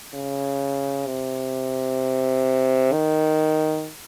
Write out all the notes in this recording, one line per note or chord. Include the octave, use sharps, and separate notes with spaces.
C#3
C3
D#3